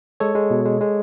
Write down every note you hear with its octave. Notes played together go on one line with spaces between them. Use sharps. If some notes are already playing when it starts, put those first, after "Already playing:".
G#3 A4 C#5
G#3
B2
G#3
G#3